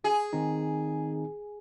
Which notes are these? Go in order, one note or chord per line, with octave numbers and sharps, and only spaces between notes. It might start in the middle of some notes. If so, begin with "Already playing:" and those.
G#4
D#3 C4 D#4